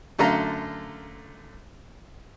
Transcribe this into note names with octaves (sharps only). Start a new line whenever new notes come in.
F#2 D3 A3 F5 A#5